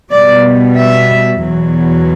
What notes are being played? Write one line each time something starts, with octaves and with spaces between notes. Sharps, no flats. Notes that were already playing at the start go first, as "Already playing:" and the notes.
B2 G3 D5
E5
E2 B2 F#3